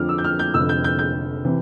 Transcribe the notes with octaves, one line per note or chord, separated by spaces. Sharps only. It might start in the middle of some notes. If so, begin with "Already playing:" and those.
Already playing: F2 D3 F3 D6 F6
E6
G6
F6
G6
F1 F2 D3 E6
G6
G6
G6
C3 E3